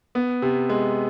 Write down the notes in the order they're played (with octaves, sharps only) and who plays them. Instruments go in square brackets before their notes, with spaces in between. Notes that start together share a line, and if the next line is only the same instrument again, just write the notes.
[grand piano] B3
C3
G#3